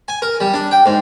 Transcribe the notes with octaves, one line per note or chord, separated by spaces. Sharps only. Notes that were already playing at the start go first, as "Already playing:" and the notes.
G#5
A#4
G3
D4
G5
G#2